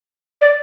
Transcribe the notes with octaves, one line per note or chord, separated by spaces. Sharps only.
D5